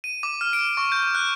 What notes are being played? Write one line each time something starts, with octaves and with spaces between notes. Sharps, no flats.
D#7
D6
F6
D7
C#6
G6
F#6